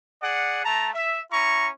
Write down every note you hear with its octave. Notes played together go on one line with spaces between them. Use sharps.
G#4 D5 F#5
A3 A5 A#5
E5
C#4 E4 A#5 C#6